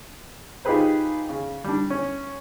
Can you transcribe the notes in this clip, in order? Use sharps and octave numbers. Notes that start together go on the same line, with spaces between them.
D#4 F4 G4 G#4 B4 C5
C#3
G3 D4
C#4